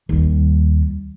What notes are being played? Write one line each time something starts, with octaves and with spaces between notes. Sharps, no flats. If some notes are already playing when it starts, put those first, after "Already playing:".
D#2 G3